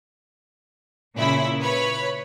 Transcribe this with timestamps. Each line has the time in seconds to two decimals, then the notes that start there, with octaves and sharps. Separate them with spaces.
1.16 A#2 C#3 E4 B5
1.60 B4 C#5 B5